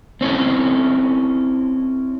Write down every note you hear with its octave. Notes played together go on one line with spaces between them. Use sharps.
C4 C#4 E4 A4